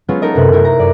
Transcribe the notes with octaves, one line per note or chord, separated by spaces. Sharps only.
F#3 G#3 B3 C#4 F4 F#4
D#4 A4 A#4 D#5
F#2 C3 B3 F#6
C3 A3 E4 A#4
A#5 A#6
F#2 D5